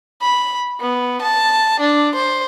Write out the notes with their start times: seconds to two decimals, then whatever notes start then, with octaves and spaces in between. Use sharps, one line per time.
0.22 B5
0.80 B3
1.22 A5
1.80 D4
2.15 C5